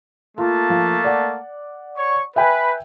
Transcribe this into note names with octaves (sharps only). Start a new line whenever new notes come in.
A3 A#3 F4 A5
F3
D5 F#5
C#5 C#6
B4 E5 G5 G#5